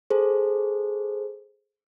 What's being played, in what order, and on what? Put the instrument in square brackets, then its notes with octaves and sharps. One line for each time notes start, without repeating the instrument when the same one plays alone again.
[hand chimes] G#4 A4 C5